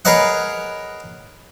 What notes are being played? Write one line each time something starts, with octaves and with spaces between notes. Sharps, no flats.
G#4 A#4 B4 C#5 D#5 F#5